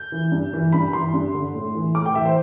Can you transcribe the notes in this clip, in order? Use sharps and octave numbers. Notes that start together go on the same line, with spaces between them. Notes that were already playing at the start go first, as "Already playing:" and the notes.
Already playing: G6
E3
G2
E3
G2 B5
E3 C6
G2
D3
A2
E3
A2 D6
G5
E3 E5
C5